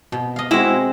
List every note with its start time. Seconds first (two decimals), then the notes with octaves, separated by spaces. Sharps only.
0.12 B2
0.36 D#5 F5
0.51 G#3 C4 E4 F#4 G#4